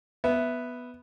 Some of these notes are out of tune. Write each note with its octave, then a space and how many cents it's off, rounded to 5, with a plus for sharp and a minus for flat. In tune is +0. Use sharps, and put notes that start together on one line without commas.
B3 +0 E5 +0